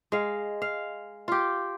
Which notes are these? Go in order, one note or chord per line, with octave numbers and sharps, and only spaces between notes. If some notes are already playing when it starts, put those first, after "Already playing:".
G#3 F5
F5
F4 G4